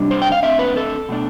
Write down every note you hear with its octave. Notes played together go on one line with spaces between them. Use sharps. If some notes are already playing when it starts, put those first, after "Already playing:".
Already playing: C3 G3 D4
C5
G5
F5
D3 A3 C4 E5
B4
A4
B2 A3 D4